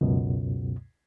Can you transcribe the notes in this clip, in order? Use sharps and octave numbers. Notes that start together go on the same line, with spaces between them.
C#2 F#2 B2